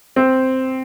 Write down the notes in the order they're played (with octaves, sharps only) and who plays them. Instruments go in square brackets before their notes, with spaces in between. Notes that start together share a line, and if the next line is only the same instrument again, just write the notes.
[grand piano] C4